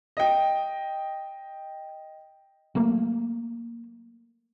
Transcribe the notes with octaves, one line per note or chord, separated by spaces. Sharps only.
D#5 G5
F#3 A3 A#3